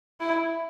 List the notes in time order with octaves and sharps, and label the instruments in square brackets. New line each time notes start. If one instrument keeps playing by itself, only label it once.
[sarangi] E4